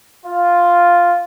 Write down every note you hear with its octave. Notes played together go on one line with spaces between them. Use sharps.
F4